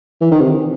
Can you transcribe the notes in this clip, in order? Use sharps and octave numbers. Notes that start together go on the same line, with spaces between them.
E3
D#3
C3